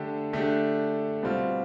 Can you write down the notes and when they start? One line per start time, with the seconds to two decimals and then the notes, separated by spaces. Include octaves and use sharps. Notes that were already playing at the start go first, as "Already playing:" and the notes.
Already playing: D3 A3 D4 G4
0.33 D3 A3 D4 G4
1.23 B2 G3 C4 F4